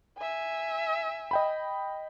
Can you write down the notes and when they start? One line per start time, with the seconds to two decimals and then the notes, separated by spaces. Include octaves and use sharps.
0.19 E5 G#5
1.31 D#5 G5 B5